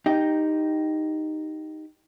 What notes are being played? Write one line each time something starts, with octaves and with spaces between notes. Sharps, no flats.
D#4 G4